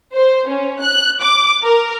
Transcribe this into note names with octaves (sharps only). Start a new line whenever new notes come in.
C5
C#4
F#6
D6
A#4